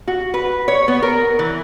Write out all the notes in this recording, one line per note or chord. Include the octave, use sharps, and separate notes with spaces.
F#4
B4
C#5
B3
A#4
E3